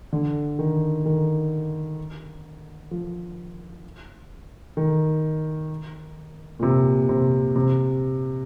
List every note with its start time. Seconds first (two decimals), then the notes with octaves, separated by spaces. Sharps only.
0.13 D3
0.59 D#3
1.05 D#3
2.91 F3
4.77 D#3
6.59 A#2
6.63 C3
7.09 C3
7.56 C3